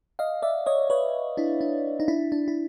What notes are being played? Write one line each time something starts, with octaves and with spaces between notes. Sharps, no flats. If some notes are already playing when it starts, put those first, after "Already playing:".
D#5 F5
D5 E5
C#5 D#5
B4 C#5
D4 E4
D4
D#4
D4 E4
D4
E4